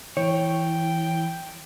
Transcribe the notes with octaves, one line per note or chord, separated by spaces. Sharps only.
E3 C#5 G5